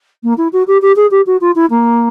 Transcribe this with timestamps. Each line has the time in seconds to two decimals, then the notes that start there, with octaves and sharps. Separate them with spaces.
0.23 A#3
0.37 E4
0.52 F#4
0.67 G4
0.82 G4
0.96 G#4
1.11 G4
1.26 F#4
1.41 F4
1.55 E4
1.70 A#3